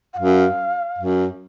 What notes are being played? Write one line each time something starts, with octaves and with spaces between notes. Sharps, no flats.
F#5
F#2 F5
F#2